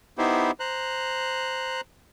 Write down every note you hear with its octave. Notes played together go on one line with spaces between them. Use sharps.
B3 D#4 E4 G4 C5
C5 A#5 F#6